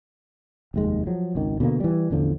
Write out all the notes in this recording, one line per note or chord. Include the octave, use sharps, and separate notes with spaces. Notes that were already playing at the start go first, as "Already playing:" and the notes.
F1 D#2 G#3
F3 F#3
G#1 C#2 D#3
B2 D3 E3 A#3
E3 G3
A1 E2 D3 F3